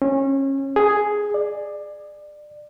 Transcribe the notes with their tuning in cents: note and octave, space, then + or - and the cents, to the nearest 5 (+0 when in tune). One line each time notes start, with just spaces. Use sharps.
C#4 -25
G#4 +5
D5 +20